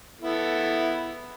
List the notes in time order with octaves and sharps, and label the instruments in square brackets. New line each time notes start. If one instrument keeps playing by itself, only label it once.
[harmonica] B3 E4 A4